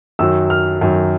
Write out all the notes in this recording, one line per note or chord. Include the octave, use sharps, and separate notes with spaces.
F#2 D#3 F#3 E6
F6
F#2 D#3 F#3